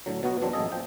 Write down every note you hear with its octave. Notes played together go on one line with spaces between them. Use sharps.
A2 D3 F#3
B2 F#3 B3 F#4
E2 B2 F#3 C4 D4
A1 F#2 A#3 G#4 A4 D#5
F3 G5